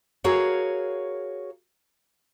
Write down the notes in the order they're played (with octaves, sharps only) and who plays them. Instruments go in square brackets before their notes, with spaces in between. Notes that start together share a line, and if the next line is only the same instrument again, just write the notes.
[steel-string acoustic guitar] F#4 G#4 A#4 C#5 F5